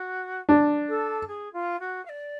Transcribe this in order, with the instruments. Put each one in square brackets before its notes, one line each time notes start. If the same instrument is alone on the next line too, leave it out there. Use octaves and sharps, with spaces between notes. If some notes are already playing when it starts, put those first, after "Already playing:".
Already playing: [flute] F#4
[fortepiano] D4
[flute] A4
G#4
F4
F#4
F5
D5